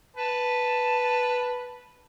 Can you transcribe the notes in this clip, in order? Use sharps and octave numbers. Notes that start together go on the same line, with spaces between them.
B4 A5